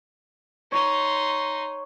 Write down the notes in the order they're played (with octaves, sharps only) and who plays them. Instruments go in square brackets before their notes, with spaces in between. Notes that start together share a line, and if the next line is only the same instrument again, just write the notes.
[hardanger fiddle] D#4 C6 [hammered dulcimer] C#5